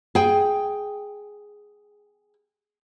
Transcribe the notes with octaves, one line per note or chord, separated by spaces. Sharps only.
G#4 G5